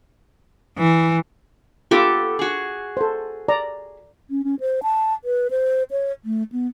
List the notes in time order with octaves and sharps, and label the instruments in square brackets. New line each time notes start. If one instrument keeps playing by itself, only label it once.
[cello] E3
[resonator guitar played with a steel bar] B3 G4 A4 [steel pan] F4 D6
[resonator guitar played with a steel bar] F#4 G#4
[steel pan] A4 C5
D5 A#5
[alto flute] C#4
C#4
C5
A5
B4
C5
C#5
A3
B3